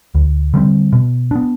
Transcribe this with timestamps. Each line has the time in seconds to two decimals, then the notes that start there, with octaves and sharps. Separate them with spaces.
0.15 D2
0.54 D3 G3 C4
0.93 B2
1.31 B3 D4